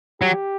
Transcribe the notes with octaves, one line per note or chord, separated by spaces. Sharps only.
F#3 G4